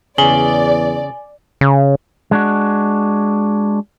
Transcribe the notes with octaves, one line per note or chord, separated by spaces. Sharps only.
E2 C#3 D5 G#5 F#7 G7
C#3
G#3 D4 F#4